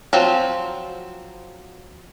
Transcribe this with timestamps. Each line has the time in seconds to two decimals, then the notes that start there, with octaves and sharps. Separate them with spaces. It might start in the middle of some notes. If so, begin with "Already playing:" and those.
0.13 F3 F#3 C4